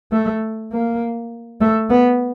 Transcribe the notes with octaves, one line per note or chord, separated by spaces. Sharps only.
A3
A#3
A3
B3